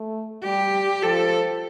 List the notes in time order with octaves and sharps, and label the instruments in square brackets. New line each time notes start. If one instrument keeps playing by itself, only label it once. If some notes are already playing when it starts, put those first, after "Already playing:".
Already playing: [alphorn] A3
[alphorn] G3 [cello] G4
[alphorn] F3 [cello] A4